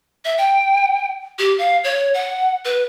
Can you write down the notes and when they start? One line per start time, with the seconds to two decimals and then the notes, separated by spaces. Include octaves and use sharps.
0.25 E5
0.38 G5
1.39 G4
1.58 F5
1.84 C#5
2.14 F#5
2.65 B4